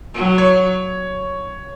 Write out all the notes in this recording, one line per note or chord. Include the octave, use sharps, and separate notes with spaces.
F#3
C#5